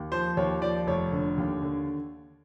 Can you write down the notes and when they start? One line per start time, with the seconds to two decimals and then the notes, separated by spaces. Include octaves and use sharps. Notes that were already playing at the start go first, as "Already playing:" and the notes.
Already playing: D#2
0.12 F3 C5
0.37 D#2 C#5
0.62 F3 D5
0.87 F1 C#5
1.12 D3
1.37 D#2
1.62 D3